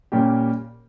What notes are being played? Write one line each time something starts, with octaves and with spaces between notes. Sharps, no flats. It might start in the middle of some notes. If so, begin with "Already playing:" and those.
A#2 G3 A#3 C#4 G4